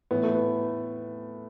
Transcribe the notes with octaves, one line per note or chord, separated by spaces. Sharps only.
A2 E3 B3
A3
B3